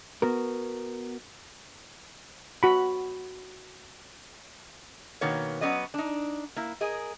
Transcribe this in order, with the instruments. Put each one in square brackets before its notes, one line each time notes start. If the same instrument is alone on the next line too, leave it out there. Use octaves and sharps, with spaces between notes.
[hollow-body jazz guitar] B3 F#4 A#4
[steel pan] F#4 B5
[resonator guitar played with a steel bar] B2 D#3 A#3 B3 C#5
F#3 B3 C#4 B4 D5 D#5
D4 D#4
A#3 E4
G#4 A#4 D#5